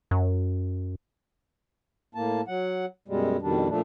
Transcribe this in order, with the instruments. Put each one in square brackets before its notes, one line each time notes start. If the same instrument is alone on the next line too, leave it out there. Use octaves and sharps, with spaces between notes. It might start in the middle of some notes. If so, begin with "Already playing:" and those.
[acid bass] F#2
[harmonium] A2 A#3 A5
F#3 F#5
F#2 B2 G3 G#3
F2 B2 D#3 G3 D4
A#2 F3 A3 D4